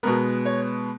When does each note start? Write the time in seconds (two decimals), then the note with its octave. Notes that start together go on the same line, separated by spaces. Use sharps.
0.03 B2 G#3 B3 A#4
0.45 C#5